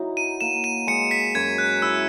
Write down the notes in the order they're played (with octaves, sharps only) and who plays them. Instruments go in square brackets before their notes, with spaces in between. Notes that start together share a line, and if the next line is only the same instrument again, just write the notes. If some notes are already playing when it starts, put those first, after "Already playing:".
Already playing: [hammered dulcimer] F#3 D#4 E4
[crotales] D#7
[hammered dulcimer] A#3 [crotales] E7
[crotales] D#7
[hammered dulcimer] G#3 [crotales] C#7
[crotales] B6
[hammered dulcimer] F#2 [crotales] G#6
[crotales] F#6
[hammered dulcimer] E4 [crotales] E6